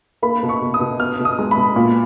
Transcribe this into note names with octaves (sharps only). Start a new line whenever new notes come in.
A#3 B5
B2
C#6
B2
D#6
B2
B3 F6
B2
D#6
G#3
B5
B2
A#2